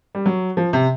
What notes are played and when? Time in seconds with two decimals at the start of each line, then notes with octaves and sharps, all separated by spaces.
0.15 G3
0.26 F#3
0.57 F3
0.73 C3